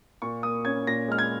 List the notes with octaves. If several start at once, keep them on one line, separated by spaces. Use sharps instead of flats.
A#2 C#6
A#3 D#6
C#4 G#6
A#2 A#6
G#3 F6
G#6